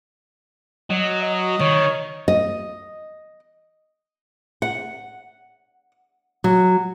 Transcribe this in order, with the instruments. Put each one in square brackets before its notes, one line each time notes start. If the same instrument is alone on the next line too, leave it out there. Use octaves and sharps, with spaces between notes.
[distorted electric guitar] F#3 [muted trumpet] D#5
[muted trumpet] D#5
[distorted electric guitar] D#3 [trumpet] C#5
[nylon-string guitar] D#5
F#5
F#3